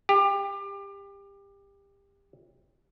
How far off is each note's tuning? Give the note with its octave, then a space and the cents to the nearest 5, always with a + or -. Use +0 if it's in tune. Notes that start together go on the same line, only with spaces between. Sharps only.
G4 +25